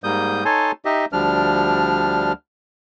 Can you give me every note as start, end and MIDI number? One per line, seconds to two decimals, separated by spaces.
0.04 0.44 44
0.04 0.44 55
0.04 0.44 58
0.04 0.44 87
0.04 0.44 91
0.45 0.72 63
0.45 0.72 69
0.45 0.72 73
0.45 0.72 80
0.45 0.72 81
0.45 0.72 84
0.85 1.05 63
0.85 1.05 67
0.85 1.05 75
0.85 1.05 76
1.12 2.32 38
1.12 2.32 53
1.12 2.32 55
1.12 2.32 62
1.12 2.32 89